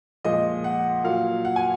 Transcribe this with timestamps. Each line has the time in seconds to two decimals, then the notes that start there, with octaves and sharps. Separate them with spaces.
0.25 A#2 F3 G#3 D#5
0.64 F#5
1.04 A#2 F#3 F5
1.45 F#5
1.56 G#5